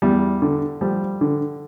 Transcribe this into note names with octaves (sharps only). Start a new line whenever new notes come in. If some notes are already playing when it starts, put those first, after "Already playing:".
E2 G3
D3
F3 G3
D3